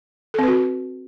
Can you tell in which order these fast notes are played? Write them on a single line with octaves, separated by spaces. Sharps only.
A4 C4 B4 F#4